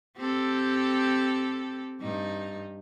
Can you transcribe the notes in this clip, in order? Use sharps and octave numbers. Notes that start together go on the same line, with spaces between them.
C4 G4 A4
G2 D#4